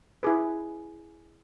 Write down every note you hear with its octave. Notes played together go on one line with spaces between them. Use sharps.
E4 G#4 B4